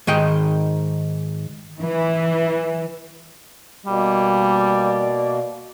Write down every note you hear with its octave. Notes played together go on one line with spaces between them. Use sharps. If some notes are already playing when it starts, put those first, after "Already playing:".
G#2 D#3 D#5 G5
E3
B2 G3 A#3 D5